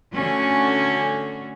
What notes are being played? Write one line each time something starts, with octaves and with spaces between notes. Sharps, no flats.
D3 A3 C#4 F#4